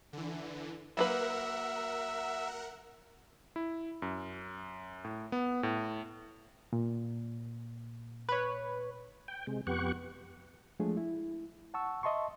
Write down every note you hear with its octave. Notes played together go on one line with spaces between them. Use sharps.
D3 E3
F#3 A#3 A#4 B4 E5 F#5
E4
F#2
A2
B3
A2
A#2
B4 C#5
G5
C3 G#3
F2 B3 G4 F#5 C#6
F3 G#3 A3 D4 G#4
E4
F#5 A5 C#6 E6
D#5 E5 A5 C6 C#6